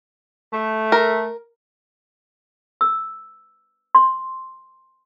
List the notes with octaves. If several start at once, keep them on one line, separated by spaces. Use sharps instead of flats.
A3
A#4
E6
C6